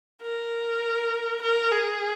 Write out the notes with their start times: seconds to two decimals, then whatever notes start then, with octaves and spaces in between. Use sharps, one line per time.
0.23 A#4
1.42 A#4
1.71 G#4